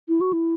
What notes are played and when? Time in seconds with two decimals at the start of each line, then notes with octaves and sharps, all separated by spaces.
0.09 E4
0.21 F#4
0.33 E4